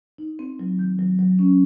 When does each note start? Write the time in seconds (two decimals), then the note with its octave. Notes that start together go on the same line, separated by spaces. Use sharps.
0.18 D#4
0.39 C4
0.60 F#3
0.79 D#3
0.99 F#3
1.19 F#3
1.39 C#4